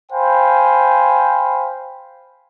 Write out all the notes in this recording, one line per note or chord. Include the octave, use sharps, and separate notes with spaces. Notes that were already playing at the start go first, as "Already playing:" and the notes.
C5 F5 G5 G#5 B5